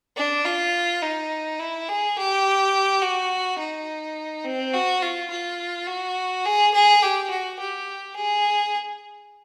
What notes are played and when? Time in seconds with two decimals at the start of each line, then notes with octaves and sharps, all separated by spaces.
0.17 D4
0.45 F4
1.02 D#4
1.59 E4
1.89 G#4
2.17 G4
3.02 F#4
3.59 D#4
4.45 C4
4.74 F#4
5.02 F4
5.30 F4
5.87 F#4
6.45 G#4
6.74 G#4
7.02 G4
7.31 F#4
7.60 G4
8.16 G#4